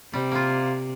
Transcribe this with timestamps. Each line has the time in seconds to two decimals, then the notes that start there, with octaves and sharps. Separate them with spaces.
0.13 C3 G3
0.32 A#3 F4